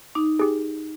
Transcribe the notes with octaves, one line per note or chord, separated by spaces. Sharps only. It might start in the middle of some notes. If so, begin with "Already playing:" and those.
D#4 D6
G4 G#4